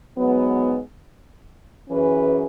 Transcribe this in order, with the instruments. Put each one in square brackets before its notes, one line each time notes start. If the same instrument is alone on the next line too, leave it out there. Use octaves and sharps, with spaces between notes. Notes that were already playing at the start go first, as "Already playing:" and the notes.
[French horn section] G#2 F#3 B3
F#2 E3 C#4 G#4 B4